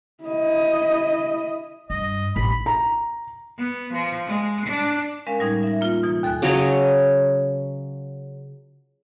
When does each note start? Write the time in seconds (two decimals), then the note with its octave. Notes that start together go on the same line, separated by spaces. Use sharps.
0.24 E4 D#5
1.90 G2 D#5
2.36 A1 B5
2.66 A#5
3.58 B3
3.94 F3
4.27 G#3
4.67 D4
5.27 G#3 C#4 A#4 F5
5.39 A2 G3 D#4 G#6
5.63 E5 A#6
5.81 A#3 F4
6.03 B2 E3
6.23 D#2 A4 G#5 F#6
6.42 C#3 F#3 C#5 D#5